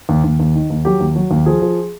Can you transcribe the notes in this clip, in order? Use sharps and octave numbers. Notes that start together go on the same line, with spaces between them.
D#2
D#2
D#2
D#3
D#2
F#3 G4
D#2
F#3
D#2
F3 G#4
F3